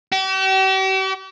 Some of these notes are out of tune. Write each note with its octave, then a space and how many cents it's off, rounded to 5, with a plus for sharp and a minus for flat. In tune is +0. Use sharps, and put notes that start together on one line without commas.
G4 -45